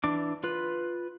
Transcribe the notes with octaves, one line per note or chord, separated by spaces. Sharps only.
E3 D4 D6
F4 B4